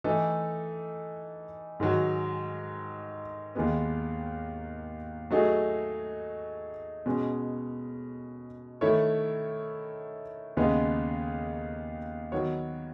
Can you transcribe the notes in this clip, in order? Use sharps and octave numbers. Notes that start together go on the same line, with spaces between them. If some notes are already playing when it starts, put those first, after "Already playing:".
E3 A3 D#4 A4
G#2 D#3 F#3
D#2 D#3 G#3 B3
F#3 A3 D#4 G#4
B2 G#3 C#4
D#3 A3 E4 A4 C#5
D#2 C#3 G#3 B3 D#4
D#3 F#3 B3 F#4 C#5